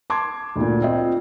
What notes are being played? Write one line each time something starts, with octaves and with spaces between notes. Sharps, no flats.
A5 C6 D6 G#6
D2 A#2
C4 F4 D5 D#5